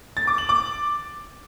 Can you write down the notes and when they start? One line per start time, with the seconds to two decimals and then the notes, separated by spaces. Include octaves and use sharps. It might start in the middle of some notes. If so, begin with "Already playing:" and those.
0.17 A6
0.27 D6
0.38 F#7
0.49 D6